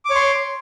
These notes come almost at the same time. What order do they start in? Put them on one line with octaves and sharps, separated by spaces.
D6 C#5 C6